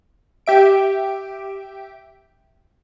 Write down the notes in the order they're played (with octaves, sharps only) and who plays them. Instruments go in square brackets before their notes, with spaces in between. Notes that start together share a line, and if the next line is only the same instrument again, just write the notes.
[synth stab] G4 E5 D7